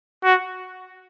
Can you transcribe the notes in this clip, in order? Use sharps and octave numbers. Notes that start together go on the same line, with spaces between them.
F#4